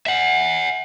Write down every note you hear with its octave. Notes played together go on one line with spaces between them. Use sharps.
E5 F#5